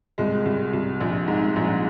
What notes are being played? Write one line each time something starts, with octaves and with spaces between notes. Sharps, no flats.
C2 G#3
C2
C2
A#1
G#2
A#1